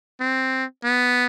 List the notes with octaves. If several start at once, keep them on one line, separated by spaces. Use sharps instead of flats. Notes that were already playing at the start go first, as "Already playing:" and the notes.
C4
B3